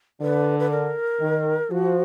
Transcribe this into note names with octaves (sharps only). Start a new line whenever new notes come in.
D3 B4
B4
A#4
D#3
F3 F#4